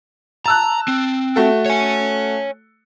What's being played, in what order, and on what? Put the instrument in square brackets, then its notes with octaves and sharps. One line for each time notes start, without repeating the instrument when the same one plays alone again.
[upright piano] A5 E6 F#6 [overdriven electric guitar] A#5
[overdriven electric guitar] C4
[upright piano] A3 F#4 A4
[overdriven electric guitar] C#5 G#5